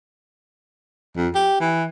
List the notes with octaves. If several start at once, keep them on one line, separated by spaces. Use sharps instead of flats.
F2
G4
E3